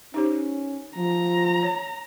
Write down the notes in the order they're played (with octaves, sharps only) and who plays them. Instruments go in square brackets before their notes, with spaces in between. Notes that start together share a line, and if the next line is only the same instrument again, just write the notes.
[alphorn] C#4 [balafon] D#4 G4 C5
[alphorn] F3 [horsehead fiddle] A#5
[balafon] C#5